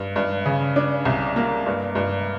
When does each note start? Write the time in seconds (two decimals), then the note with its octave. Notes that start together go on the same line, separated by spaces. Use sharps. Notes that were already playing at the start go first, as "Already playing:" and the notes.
Already playing: G2
0.16 G2
0.45 C#3
0.76 D4
1.05 C2
1.36 A#3
1.66 G2
1.95 G2